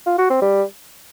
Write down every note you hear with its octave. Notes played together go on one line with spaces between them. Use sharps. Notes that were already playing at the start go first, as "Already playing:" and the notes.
F4
F#4
C4
G3